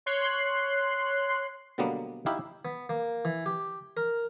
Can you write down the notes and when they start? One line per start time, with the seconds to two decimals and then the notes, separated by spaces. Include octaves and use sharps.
0.06 C#5 C6 F#6 C7
1.78 B2 D3 F#3 G3 A#3 B3
2.26 D#4 E4 G4 F5
2.65 B3
2.89 A#3
3.25 E3
3.46 G4
3.97 A#4